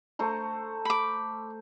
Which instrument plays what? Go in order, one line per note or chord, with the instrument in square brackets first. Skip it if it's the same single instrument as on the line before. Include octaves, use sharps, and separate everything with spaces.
[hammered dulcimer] A3 C5 A#5
[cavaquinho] B5 D6